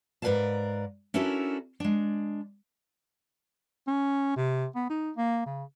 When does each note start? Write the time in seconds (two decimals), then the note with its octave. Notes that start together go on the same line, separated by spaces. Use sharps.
0.22 G#2 A#4 B4 D5 F5 A5
1.14 C#4 D4 E4 F#4 A4 A#4
1.80 G#3 D4
3.87 C#4
4.37 C3
4.75 B3
4.90 D#4
5.17 A#3
5.46 C#3